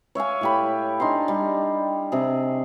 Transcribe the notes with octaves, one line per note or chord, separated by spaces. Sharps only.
C#5 E5 F5 G#5
A2 G4 B5
D4 D#4 G#5 C6
G3
C3 G#4